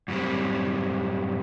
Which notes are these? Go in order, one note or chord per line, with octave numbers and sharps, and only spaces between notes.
F#2 A2 G3 C4